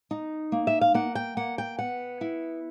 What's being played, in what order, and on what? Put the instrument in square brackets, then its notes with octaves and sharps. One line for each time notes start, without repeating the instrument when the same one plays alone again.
[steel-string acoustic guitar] D#4
A#3
E5
F5
A#3 F#5
G5
A#3 F#5
G5
B3 F#5
E4